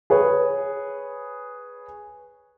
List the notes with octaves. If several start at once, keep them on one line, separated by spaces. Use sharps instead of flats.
G#4 B4 C#5